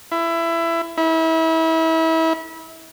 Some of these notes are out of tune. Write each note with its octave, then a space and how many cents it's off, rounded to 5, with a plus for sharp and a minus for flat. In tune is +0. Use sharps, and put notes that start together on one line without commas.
E4 +20
E4 -30